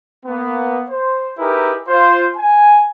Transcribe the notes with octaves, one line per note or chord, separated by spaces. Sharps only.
A#3 B3
C5
D#4 E4 G4 G#4 A#4 B4
F4 C5
G#5